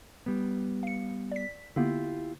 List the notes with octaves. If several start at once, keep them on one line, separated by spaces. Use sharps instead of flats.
G3 B3
F5 C#7
D5 B6
D3 A#3 B3 E4 F4 G4